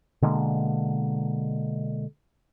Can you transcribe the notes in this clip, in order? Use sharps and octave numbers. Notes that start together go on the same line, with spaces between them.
B2 D3 G#3 A#3